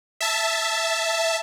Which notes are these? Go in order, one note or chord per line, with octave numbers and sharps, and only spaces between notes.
E5 A5